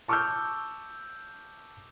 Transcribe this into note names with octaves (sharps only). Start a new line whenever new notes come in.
A5 C#6 D6 E6 F6 G6